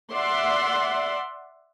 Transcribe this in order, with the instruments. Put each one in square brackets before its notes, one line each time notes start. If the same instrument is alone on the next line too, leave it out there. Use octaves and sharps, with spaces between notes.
[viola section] D5 E5 F#5 C6